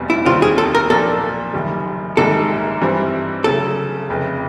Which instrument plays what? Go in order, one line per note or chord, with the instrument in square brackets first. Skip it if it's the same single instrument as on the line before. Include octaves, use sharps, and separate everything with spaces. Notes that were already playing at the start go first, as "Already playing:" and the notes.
Already playing: [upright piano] F1 E2 B2 G3 C4
[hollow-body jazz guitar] E4
[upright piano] D#2 D#3 G3 C4 [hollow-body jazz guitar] F4
[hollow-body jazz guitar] G#4
A4
A#4
[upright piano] B1 A#2 F3 A#3 D4 [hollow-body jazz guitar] A4
[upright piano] F#1 F#2 D#3 G3
[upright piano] A#1 G#2 D#3 G3 A#3 [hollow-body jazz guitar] A4
[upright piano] G2 E3 G3 C4 E4
[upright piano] D2 C#3 F#3 [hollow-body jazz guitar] A4
[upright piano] F1 F2 C#3